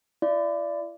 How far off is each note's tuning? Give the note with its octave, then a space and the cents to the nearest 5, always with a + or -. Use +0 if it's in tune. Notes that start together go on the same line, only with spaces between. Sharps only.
E4 +40 D5 +0